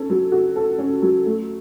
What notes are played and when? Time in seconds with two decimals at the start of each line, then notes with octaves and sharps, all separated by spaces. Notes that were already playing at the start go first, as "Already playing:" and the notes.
Already playing: C#4 A4
0.10 F#3
0.32 F#4
0.56 A4
0.78 C#4
1.02 F#3
1.26 A3